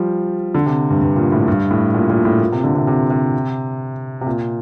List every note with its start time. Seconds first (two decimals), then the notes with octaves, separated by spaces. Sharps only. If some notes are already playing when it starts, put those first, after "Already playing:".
Already playing: F3 G3
0.55 D3
0.66 C3
0.90 G2
1.01 G2
1.16 A#2
1.32 A2
1.48 G2
1.71 A2
1.95 A#2
2.10 A#2
2.25 A2
2.41 A#2
2.52 C3
2.64 D3
2.75 C3
2.87 C3
3.10 C3
4.21 C3
4.27 A#2